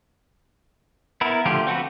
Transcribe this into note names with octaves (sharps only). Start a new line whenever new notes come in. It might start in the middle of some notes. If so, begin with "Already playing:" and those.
B3 E4 A#4
D3 F3 A3 F4 G4
C4 F#4 A4 B4